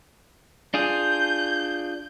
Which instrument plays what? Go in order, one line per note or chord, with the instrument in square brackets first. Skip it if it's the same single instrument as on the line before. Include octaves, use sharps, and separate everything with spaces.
[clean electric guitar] D4 F4 G#4 [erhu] G6